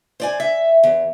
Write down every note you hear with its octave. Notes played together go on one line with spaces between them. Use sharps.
C5 D5 G#5
E5
E2